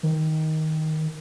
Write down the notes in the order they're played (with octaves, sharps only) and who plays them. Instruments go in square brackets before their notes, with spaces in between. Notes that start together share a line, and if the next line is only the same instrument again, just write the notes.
[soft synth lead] D#3